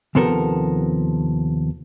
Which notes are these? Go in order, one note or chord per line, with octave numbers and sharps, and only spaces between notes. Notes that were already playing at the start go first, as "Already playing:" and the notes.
D#2 C3 F3 B3 A4 A#4